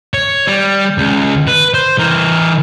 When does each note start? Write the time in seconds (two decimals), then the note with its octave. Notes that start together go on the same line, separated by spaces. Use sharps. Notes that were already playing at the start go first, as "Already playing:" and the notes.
0.14 C#5
0.47 G3
0.98 C#2
1.47 B4
1.74 C5
1.98 E3 A#4